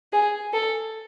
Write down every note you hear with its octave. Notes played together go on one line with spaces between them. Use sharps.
G#4
A4